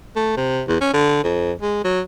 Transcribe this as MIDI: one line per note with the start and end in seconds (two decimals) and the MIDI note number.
0.16 0.34 57
0.37 0.62 48
0.68 0.81 40
0.81 0.90 61
0.94 1.19 50
1.24 1.52 41
1.62 1.81 56
1.84 2.01 54